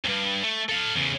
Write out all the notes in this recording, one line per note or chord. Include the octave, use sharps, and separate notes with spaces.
C#2 G2
A3
A4 F5
E2 C#3